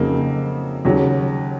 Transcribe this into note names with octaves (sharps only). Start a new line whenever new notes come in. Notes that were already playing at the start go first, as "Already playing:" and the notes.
Already playing: F2 C#3 F#3 A#3 D#4
D#2 C#3 F#3